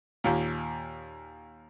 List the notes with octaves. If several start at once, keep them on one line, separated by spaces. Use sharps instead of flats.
D#2 A#2